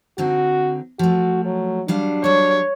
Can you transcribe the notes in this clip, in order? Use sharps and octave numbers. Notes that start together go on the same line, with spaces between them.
D3 C4 D#4 F#4
F3 A3 F#4
F#3
F#3 G3 D4 F5
F#3 G3 C#5